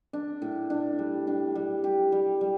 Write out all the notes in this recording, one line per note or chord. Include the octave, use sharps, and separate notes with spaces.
D4
A2
D4
G3
D4
G3
G4
G3
G3